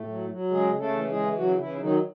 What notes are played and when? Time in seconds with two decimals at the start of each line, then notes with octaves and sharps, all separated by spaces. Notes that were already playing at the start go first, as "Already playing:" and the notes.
Already playing: A2 A3
0.08 F#3
0.29 F#3
0.50 C#3 G#3 G#4
0.73 C#3
0.79 A3 A4
0.94 E3
1.09 G#3 G#4
1.15 E3
1.37 C#3 F#3 F#4
1.58 C#3 E3 E4
1.80 D#3 F#3 D#4